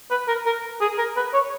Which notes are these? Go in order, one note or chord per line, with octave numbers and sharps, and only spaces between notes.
B4
A#4
A#4
G#4
A#4
B4
C#5